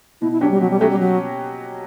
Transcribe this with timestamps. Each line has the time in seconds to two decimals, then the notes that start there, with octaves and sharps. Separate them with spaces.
0.21 B2 E4
0.32 E4
0.41 F#3 C#4 D4 G4
0.51 G3
0.61 B2 F#3
0.71 G3
0.80 F#3 A3 C#4 G4
0.90 G3
1.00 F#3